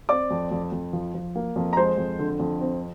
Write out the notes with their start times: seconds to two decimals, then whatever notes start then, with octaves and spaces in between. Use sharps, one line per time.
0.09 C4 D5 D6
0.31 F2
0.51 F2
0.72 F2
0.93 F3
1.14 F3
1.36 A#3
1.56 F2
1.73 A#5
1.77 G#3 C5 C6
1.98 F2
2.19 D3
2.40 F2
2.61 C4